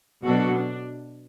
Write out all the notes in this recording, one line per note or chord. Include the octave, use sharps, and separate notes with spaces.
B2 F#3 B3 D4 F#4 A4
D4